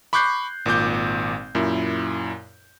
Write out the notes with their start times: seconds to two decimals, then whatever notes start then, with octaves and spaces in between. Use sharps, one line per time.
0.13 B5 C#6 D6 F#6 G6 C7
0.66 G#1 A#2 D6 G6
1.55 F#2 A#2 E4